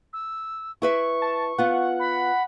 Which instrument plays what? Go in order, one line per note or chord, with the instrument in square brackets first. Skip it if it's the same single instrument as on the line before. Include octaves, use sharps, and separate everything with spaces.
[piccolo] E6
[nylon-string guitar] E4 B4 E5 [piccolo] C#6
[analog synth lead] A5
[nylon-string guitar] B3 F4 [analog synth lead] F#5
[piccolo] B5